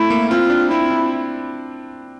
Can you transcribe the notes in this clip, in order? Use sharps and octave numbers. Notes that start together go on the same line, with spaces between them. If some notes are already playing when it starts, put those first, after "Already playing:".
Already playing: A3 C4 E4
A#3
C4 F4
D4
C4 E4
D4